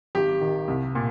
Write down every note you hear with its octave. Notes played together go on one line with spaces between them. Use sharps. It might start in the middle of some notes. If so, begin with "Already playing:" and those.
G#1 G4
D#3
C2
A#2